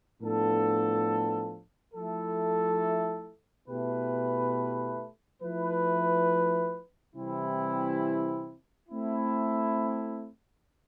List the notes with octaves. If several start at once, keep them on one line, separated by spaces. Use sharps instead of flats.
A2 F3 B3 D4 A4
F3 A3 E4 A4
B2 A3 E4 G4 B4
F3 A3 E4 B4
C3 E3 G3 C4 E4
A3 C4 E4